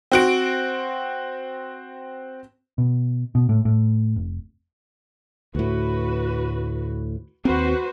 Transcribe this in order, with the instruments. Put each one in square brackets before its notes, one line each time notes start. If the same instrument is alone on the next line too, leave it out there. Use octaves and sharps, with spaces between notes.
[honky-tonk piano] C4 F#4 D7
[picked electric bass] B2
B2
A2
A2
F1
[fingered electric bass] D2 A2 [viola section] F#4 B4
[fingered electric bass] D#2 C4 [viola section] F#4 B4 C5